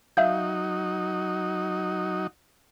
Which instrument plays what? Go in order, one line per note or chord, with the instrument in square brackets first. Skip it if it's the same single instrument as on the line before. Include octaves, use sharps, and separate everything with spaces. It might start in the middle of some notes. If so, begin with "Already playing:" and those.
[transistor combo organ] F#3 D#4 [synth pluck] E5 F5 G6